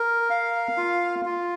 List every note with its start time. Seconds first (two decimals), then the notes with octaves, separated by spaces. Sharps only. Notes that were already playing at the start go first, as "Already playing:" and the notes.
Already playing: A#4
0.30 F5
0.77 F4
1.25 F4